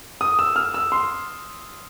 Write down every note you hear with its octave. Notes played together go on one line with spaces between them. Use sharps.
D#6
E6
F6
E6
C6